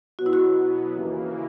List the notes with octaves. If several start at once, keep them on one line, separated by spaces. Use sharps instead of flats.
B2 F#3 B3 F#4
E4
F#4
D#2 C#3 E3 A#3